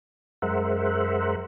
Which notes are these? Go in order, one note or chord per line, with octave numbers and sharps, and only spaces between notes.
F#2 G#3 A#4 C5 E5 F#5